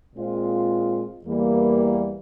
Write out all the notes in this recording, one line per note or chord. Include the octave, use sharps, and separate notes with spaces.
A#2 G#3 C4 F4
E2 E3 G3 A#3